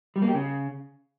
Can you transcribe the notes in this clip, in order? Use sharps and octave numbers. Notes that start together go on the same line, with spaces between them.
G3
A#3
G4
C#3